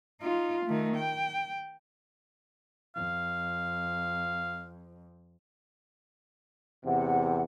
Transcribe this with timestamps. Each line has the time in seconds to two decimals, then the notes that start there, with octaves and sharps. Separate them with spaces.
0.21 D#4 F4
0.65 D#3 A3
0.96 G5
2.96 F2 F5
6.86 E2 C3 F#5